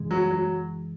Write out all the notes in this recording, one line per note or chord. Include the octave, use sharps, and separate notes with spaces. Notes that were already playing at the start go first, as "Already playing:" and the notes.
Already playing: F#2 C#3 E3 G#3
F#3
F#3